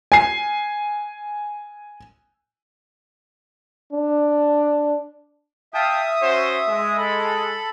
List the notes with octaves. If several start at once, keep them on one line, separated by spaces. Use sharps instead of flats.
G#5 C7
D4
E5 F5 G5 A5 D#6
C#4 F#4 C5
G#3
A4 B5